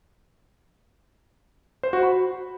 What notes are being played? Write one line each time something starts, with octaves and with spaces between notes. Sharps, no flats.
C5
F#4
B5